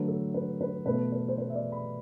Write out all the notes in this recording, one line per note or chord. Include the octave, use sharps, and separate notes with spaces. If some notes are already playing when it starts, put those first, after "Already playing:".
Already playing: D3 F#3 A3 B4
A4
B4
B4
B2 A3 B4
B4
C5
B4
E5
D5
B5